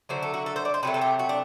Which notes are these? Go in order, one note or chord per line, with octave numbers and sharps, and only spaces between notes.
D3 F#3 A3 C5
A4
F#4
A4
C5
D5
C5
C3 F#3 A3 B4
A4
G4
F#4
D4